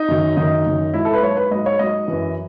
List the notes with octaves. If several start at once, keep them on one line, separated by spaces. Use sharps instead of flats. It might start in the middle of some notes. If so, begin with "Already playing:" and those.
Already playing: D#4
F#2 D#3 F#3
F#2 D#3 F#3 D#4
F#2 D#3 F#3
G#2 F#3 E4
A4
B4
G#2 F#3 C#5
B4
G#2 F#3 D#5
C#5
G#2 F#3 D#5
F#2 E3